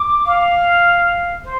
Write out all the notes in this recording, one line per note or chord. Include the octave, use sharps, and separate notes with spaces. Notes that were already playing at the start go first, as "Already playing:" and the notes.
Already playing: D6
F5
C5